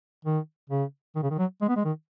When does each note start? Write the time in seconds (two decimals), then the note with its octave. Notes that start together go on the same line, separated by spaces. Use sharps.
0.25 D#3
0.70 C#3
1.15 D#3
1.23 C#3
1.31 D#3
1.38 F#3
1.62 G#3
1.69 B3
1.76 G#3
1.85 D#3